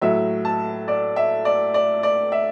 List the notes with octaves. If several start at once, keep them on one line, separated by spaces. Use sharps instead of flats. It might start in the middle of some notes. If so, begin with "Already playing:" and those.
A2 F#3 E5
A5
D5
E5
D5
D5
D5
E5